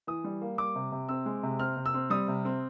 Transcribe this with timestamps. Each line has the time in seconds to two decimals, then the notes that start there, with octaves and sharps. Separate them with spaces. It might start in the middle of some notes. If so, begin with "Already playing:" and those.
0.07 E3 D#6
0.24 G3
0.42 A#3
0.58 G3 D6
0.76 C3
0.92 C3
1.09 C4 E6
1.26 G#3
1.43 C3
1.59 C4 F6
1.77 C3
1.86 E6
1.94 C4
2.10 G3 D#6
2.28 C3
2.45 C4